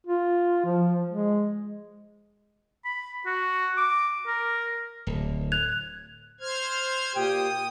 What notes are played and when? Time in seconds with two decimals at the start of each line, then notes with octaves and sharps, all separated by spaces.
0.07 F4
0.65 F3
1.09 G#3
2.85 B5
3.26 F#4
3.77 D6
4.27 A#4
5.07 D1
5.52 F#6 G#6 F7
6.40 C5 F6 G#6
7.16 A#2 G4 G5 D#6